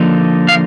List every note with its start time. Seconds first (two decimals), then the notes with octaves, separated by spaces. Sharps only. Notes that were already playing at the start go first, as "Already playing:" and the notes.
Already playing: D3 F3 A#3 D#4
0.49 F5